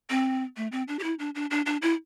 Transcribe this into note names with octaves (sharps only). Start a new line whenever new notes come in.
C4
A3
C4
D4
G4
E4
D4
D4
D4
D4
E4